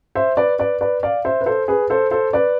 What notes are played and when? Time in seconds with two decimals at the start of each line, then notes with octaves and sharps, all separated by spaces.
0.15 C5 E5
0.37 B4 D5
0.59 B4 D5
0.81 B4 D5
1.03 D5 F5
1.25 C5 E5
1.41 B4
1.46 A4 C5
1.68 G#4 B4
1.90 A4 C5
2.11 A4 C5
2.33 B4 D5